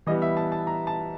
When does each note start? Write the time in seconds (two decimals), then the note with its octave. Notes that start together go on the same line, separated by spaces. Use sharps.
0.07 E3 G3 B3 D#5
0.22 E5
0.37 A5
0.52 A5
0.67 A#5
0.87 A5